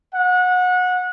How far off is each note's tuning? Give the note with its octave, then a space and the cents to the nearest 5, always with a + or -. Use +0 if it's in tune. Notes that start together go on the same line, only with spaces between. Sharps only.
F#5 -25